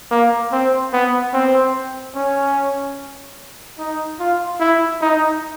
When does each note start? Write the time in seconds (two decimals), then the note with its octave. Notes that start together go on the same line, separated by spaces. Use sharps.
0.11 A#3
0.52 C4
0.93 B3
1.33 C4
2.15 C#4
3.79 D#4
4.19 F4
4.60 E4
5.01 D#4